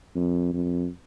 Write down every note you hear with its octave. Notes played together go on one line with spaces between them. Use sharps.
F2
F2